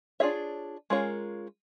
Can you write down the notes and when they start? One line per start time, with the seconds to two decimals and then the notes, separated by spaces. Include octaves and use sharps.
0.20 D4 F4 G#4 C#5 E5
0.90 G#3 C#4 F4 A#4 C#5